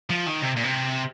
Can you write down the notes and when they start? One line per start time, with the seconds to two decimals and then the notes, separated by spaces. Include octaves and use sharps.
0.10 F3
0.26 D#3
0.42 C3
0.56 A#2
0.64 C3